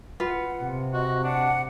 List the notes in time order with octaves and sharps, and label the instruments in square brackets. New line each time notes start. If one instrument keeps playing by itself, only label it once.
[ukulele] F4 B4 [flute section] F#5
[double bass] C3
[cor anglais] F#4 [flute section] D#5
[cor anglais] D4 [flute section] F#5